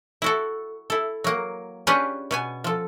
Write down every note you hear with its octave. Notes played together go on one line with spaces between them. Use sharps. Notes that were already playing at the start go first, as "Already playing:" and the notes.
E4 F#4 A4
E4 A4
F#3 A#3
C#4 D4 F4 G4 G#4 B4
B2 B3 G#5
F3 A4